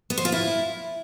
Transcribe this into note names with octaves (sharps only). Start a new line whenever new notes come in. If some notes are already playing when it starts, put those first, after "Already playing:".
B3
C5
F4
E4